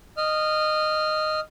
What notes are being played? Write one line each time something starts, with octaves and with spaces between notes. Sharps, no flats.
D#5 F6